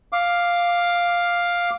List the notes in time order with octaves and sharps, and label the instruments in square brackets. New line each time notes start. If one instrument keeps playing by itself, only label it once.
[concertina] F5 D6